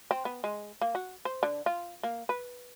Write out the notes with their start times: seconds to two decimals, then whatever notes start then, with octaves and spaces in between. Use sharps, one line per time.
0.11 C4
0.25 B3
0.44 G#3
0.81 A#3
0.95 F#4
1.25 C5
1.43 D3
1.66 F4
2.03 A#3
2.29 B4